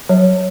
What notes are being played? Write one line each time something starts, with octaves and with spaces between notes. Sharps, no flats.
F#3 C#5